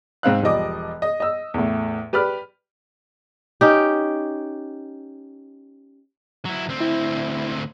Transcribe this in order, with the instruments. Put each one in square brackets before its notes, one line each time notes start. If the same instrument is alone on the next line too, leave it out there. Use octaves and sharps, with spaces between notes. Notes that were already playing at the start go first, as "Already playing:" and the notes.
[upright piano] G#2 C4 F5 F#6
E1 F3 G3 D#5 D6
D#5
D#5 E6
E2 A2
G4 B4 D5 B5 F6
[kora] C#4 D#4 G4
[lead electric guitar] F#3 E4
D2 C4
[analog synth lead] E4